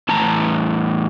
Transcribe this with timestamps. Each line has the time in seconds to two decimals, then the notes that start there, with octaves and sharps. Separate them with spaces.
0.09 E2 A2 A5 A#5